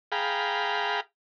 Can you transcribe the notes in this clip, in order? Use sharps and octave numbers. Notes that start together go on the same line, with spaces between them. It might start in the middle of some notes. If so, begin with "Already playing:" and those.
G#4 F5 G5 A#5 B5